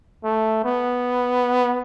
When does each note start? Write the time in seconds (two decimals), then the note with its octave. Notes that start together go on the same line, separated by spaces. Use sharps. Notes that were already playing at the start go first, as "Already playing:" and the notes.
0.24 A3
0.64 B3